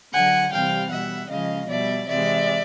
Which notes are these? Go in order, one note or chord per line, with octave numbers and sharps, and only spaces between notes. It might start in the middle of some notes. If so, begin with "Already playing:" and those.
D3 F#3 F#5 G#5
C3 E3 G3 F5 G5
B2 G3 E5 F#5
C#3 F3 G#3 D#5 F5
B2 G3 D5 E5
C3 E3 G#3 D5 E5